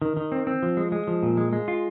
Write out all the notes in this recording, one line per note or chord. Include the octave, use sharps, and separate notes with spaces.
D#3
D#3
C4
C4
F3
G#3
G#3
F3
A#2
G#3
G#3
F4